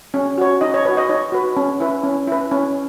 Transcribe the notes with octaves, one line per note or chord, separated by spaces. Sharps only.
C#4
F#4 C#5
D#4 D#5
C#5
F#4 B4 C#5
D#5
D#4 C#5
F#4 B4
C#4
E4 B4
C#4
E4 B4
C#4